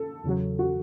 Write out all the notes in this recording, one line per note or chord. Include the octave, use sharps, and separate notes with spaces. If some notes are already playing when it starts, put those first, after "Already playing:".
Already playing: A4
E2 C#3 F#3
F#4